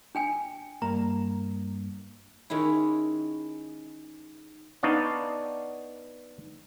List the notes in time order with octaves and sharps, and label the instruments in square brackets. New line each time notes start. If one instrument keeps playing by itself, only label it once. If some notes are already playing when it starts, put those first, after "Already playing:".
[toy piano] D4 G5 G#5
[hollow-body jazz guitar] G2 A#3 [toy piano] A#5
[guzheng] D#3 G#3 C#4 E4
[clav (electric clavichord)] B3 D4 D#4 C#5 D5 F5